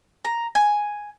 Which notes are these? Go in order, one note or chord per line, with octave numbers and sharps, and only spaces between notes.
A#5
G#5